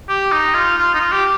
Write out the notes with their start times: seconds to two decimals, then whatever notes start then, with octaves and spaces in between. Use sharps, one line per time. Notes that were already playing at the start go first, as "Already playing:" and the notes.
0.09 G4
0.32 D#4
0.54 F4
0.78 F4
0.94 D#4
1.00 F4
1.12 G4